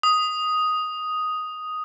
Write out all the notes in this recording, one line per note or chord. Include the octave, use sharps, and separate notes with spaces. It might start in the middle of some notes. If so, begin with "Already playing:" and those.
D#6